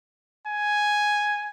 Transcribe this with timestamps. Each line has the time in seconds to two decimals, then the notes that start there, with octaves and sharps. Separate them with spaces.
0.47 G#5